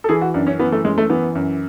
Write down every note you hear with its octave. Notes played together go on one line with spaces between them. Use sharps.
A4
E3 G#4
F#4
F#2 D4
C#4
E3 B3
A3
F#2 G#3
A3
E3 B3
F#2